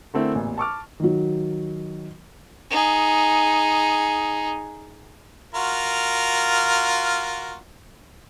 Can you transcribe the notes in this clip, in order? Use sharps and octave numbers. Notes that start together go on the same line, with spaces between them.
D3 A3 C4 E4 A#4
A1 E2 A#2
A5 C#6 D6 F6
D#3 F#3
D#4 G#4
F4 F#4 A#4